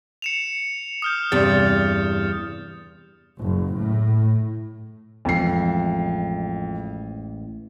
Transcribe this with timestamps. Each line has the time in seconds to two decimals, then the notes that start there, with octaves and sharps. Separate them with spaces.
0.22 C#7 E7 F7
1.02 D#6 F6 G6
1.32 E2 G2 C3 A6
3.39 F#1
3.77 A2
5.25 A1 F2 E3 G#3 C7